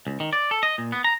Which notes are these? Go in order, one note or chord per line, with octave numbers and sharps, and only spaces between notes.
C#2
D#3
D5
A4
D#5
A#2
B3
A#5